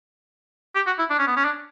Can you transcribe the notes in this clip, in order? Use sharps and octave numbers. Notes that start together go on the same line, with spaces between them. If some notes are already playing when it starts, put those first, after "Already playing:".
G4
F#4
E4
D4
C#4
B3
C#4
D4